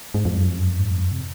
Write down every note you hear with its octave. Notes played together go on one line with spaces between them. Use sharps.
G#2
F2
F#2
F2
F#2
F2
F#2
G#2
F2
F#2
C3